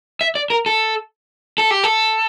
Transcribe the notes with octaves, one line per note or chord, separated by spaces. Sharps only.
E5
D5
A#4
A4
A4
G4
A4